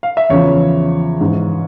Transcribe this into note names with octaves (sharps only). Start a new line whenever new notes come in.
F5
E5
E2 C#3 F3 C#5
G#2 E3